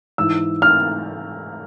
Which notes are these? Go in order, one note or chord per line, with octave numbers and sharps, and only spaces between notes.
G#2 E3 E6
F6